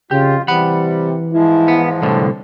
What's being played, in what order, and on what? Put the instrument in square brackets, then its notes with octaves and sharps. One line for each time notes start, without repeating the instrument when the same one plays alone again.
[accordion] F2 F4 [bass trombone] C#3 [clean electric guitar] G4
[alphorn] C3 [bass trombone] E3 [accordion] G3 [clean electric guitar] F#5 B5
[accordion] G#2 F3 G#3 [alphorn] E4
[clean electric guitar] B3
[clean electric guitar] C2 A2 D3 [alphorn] C4